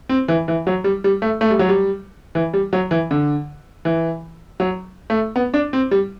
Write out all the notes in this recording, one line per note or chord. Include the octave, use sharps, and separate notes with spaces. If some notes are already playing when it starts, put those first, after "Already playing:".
C4
E3
E3
F#3
G3
G3
A3
A3
G3
F#3
G3
E3
G3
F#3
E3
D3
E3
F#3
A3
B3
D4
C4
G3